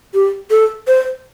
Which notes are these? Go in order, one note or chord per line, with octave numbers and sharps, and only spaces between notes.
G4
A4
C5